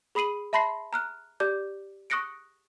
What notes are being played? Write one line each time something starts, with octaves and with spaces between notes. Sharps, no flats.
G#4 B5 D#6 C7 D#7 F#7
E5 A5 B5 C6 A#6 C7
A#5 F6 F#6
G4 D5 D6 G6
C#6 D#6 F#6 A#6 C#7 D7